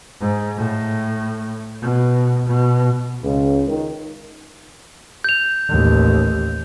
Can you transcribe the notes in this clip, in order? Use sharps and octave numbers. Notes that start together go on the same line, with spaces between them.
G#2
A2
B2
B2
C#2
D#3
G6 F7
A1 D#2